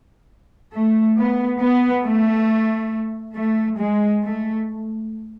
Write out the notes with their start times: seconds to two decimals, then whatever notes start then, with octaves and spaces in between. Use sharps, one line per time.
0.73 A3
1.17 B3
1.61 B3
2.05 A3
3.36 A3
3.79 G#3
4.23 A3